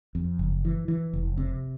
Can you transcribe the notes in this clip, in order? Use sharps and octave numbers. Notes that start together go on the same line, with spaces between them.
F2
F#1
E3
E3
F1
C3